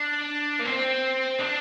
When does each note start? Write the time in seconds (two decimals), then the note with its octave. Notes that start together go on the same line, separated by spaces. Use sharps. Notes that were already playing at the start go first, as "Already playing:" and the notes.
Already playing: D4
0.60 A#3
0.66 C4
1.39 D4